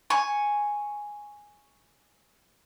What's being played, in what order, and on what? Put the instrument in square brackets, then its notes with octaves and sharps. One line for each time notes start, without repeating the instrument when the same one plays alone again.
[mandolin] G#5 C#6